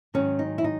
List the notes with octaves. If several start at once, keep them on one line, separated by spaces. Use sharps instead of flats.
G#2 D#3 F#3 C#4
D#4
E4
D#4